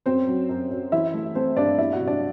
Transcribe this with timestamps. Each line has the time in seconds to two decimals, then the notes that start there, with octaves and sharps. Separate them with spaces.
0.06 F#2 C4 C5
0.27 F#3
0.49 F#2
0.71 F#2
0.92 E3 E4 E5
1.14 A3
1.35 A3 C4 C5
1.57 G2 D4 D5
1.78 B3 E4 E5
1.93 F#4 F#5
2.00 C3
2.07 D4 D5